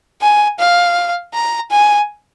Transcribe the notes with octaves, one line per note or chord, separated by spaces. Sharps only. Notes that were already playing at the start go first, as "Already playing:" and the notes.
G#5
F5
A#5
G#5